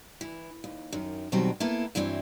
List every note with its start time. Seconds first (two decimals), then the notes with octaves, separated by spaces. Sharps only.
0.21 E3
0.64 D#2
0.93 F#2 D#3
1.32 F2 B2 D#3 F#3 G3 C4
1.60 A#3 B3 E4 A4
1.95 G2 E3 F#3 C4 E4